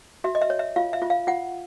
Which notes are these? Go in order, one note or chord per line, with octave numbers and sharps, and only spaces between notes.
F#4 E5
D#5
E5
C#5
E5
F4 F5
E5
F4
F5
F4 F#5